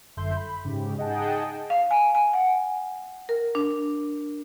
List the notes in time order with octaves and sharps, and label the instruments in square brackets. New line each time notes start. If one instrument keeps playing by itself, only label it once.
[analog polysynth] G1 F#2 A4 E5 C6 G6
B5
G#2 C#3 G4
D#4 G#4 D#5 F#5 G5 A5
[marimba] F5
G#5
G#5
F#5
A#4
D4